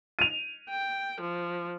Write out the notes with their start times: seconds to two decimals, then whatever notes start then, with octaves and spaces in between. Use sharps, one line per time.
0.19 D#7 F7
0.69 G5
1.21 F3